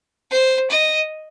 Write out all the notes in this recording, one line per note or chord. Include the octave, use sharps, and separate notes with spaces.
C5
D#5